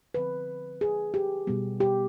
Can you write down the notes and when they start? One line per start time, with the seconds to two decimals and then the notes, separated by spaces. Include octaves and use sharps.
0.14 D3 F3 C4 B4
0.81 G#4
1.14 G4
1.47 B2 G3 B3
1.80 G4